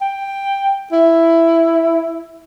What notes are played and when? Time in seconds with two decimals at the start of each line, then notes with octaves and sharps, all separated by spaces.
0.01 G5
0.92 E4